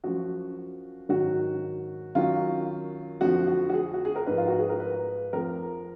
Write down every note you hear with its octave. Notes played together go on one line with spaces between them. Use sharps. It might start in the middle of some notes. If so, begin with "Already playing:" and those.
F#2 F3 F#4
G#2 D#3 F#3 F#4
F#2 D#3 F#3 F4
F2 D3 F3 F#4
F#4
F#4
G#4
F#4
G#4
A#4
G#2 F3 B4
F4
F#4
G#4
A#4
B4
F2 F3 A#4